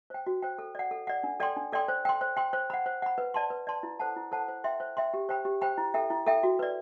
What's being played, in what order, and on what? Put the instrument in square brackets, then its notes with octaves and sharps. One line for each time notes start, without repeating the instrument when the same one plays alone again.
[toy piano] C5 G5
F#4
C5 G5
A4
D5 F#5
A4
D5 F#5
D4
A4 D5 G5 C6
D4
A4 D5 G5 C6
C5
G5 C6
C5
G5 C6
C5
F#5 B5
C5
F#5 B5
B4
D5 A5 C6
B4
D5 A5 C6
E4
A4 C5 F#5 A5
E4
A4 C5 F#5 A5
C5
E5 G5 C6
C5
E5 G5 C6
G4
C5 G5 B5
G4
C5 G5 B5
E4
A4 E5 G5
E4
A4 E5 G5
F#4
B4 D5